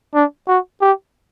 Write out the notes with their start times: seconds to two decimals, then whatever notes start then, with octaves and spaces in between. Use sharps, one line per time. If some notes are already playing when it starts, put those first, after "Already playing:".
0.14 D4
0.48 F#4
0.81 G4